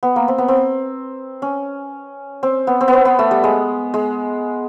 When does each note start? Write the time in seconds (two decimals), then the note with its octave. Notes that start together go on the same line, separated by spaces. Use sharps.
0.03 B3
0.16 A#3
0.28 C4
0.38 B3
0.48 C4
1.42 C#4
2.43 C4
2.67 B3
2.81 C4
2.88 B3
2.93 C4
3.05 B3
3.19 A3
3.31 G3
3.44 G#3
3.94 G#3